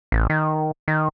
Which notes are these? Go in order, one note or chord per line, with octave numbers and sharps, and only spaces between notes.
A1
D#3
D#3